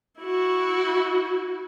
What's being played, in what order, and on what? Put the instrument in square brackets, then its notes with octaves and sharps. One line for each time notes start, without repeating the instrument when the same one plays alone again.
[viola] E4 F#4